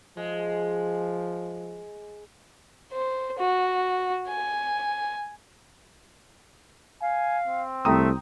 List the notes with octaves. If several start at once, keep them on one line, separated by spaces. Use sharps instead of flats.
F3 G#3
C5
F#4
G#5
F5 G#5
C4
C2 A3 G5 A#5 D#6